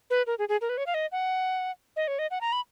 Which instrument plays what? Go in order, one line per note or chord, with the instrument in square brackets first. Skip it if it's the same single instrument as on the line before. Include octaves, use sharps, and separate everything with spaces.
[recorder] B4
A#4
G#4
G#4
A#4
B4
C#5
F5
D#5
F#5
D#5
C#5
D#5
F#5
A#5
B5